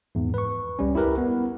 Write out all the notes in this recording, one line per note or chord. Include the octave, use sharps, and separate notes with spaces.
E2 G#2
B4 C#6
C#2 G3 C#4
E4 G4 A#4 B4
B3